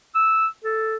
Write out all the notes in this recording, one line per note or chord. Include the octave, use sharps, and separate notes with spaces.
E6
A4